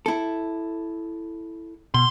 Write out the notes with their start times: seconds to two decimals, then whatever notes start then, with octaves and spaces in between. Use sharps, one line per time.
0.06 E4 A4
1.94 B2 C6